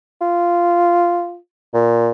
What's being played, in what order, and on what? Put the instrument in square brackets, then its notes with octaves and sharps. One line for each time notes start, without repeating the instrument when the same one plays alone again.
[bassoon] F4
A#2